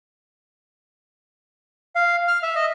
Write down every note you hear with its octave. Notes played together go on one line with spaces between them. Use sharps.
F5
F6
E5
D#5